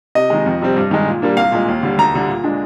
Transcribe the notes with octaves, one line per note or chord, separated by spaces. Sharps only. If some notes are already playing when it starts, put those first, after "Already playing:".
C3 D#5
D#3 G#3
F2
C3 G3 C4
G2
D#3 G#3
A#2
G3 A#3 D4
C2 F5
A#2 G#3
D#2
D3 G3
D2 A#5
D3 G3
A#2
G#3 D4